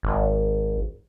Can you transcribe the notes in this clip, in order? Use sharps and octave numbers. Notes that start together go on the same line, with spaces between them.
G#1